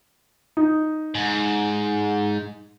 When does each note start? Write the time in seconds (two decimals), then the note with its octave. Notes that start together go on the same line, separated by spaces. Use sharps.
0.57 D#4
1.15 G#2